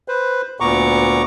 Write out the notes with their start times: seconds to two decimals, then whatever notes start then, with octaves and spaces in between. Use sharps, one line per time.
0.08 B4 C5
0.60 D2 A#2 B3 A#5 C#6 D6